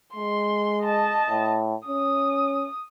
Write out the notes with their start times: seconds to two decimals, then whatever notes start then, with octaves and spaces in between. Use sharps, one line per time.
0.16 G#3 C6
0.82 D#5 A5
1.30 A2
1.88 C#4 D#6